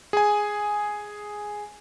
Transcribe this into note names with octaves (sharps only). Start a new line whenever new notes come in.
G#4 G#5